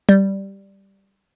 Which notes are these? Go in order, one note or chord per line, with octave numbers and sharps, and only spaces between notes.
G3